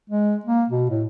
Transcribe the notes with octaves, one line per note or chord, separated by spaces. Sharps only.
G#3
A#3
B2
A2